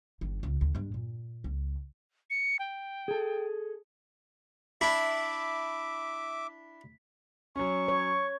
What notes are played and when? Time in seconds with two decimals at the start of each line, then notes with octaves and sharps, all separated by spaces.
0.21 G1 D#3
0.43 C#2
0.61 D2
0.75 G2 G#3
0.94 A#2
1.44 C#2
2.30 C#7
2.59 G5
3.08 G#4 A4
4.81 D4 E4 E5 D6 B6
7.56 F#3 C#4 C#6
7.88 C#5